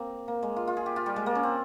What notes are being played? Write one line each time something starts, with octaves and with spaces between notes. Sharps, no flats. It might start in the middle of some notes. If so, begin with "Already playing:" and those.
Already playing: A#3 C4
A#3
G#3
F4
F4
G#4
G4
F4
G3
G#3
A#3
C#4
C4